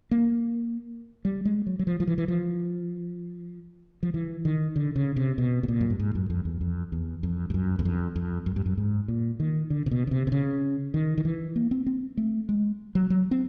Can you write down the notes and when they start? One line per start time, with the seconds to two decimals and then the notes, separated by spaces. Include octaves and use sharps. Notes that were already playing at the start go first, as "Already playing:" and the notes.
0.11 A#3
1.25 G3
1.45 G#3
1.67 F#3
1.79 F#3
1.87 F3
2.00 F3
2.07 E3
2.18 E3
2.28 F3
4.03 F3
4.14 E3
4.45 D#3
4.76 D3
4.96 C#3
5.16 C3
5.38 B2
5.63 B2
5.68 A#2
5.81 F#2
5.90 G2
5.99 G#2
6.15 F#2
6.30 F2
6.45 E2
6.61 F2
6.92 E2
7.23 F2
7.50 G2
7.54 F#2
7.79 E2
7.85 F2
8.16 F2
8.46 F#2
8.56 G2
8.66 F#2
8.78 G#2
9.08 A#2
9.40 D#3
9.70 D3
9.86 C3
9.91 B2
10.07 C#3
10.11 C3
10.27 C3
10.32 C#3
10.94 D#3
11.18 D#3
11.25 E3
11.56 A#3
11.71 C4
11.87 C4
12.17 A3
12.49 G#3
12.95 F#3
13.10 F#3
13.31 C4